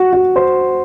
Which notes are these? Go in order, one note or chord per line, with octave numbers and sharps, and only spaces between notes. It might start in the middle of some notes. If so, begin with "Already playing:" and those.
Already playing: F#4
F#4
C5